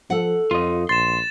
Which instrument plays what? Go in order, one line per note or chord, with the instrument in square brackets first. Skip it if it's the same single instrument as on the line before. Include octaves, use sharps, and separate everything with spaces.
[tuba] F3 [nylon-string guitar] A4 F#5
[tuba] F2 [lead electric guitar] F4 D#5
[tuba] A#1 [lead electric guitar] C6 [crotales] A6 E7